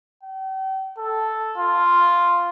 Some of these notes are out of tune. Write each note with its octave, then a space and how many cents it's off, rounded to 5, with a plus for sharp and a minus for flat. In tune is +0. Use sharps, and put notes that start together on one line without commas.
G5 -40
A4 -5
F4 +0